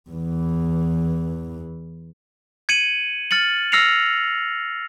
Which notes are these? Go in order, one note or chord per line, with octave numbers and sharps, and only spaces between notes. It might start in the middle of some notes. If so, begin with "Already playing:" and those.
E2 E3
G#6 C#7 D#7 F#7
F6 A6 C#7 F#7
E6 F6 A#6 C7 C#7 F7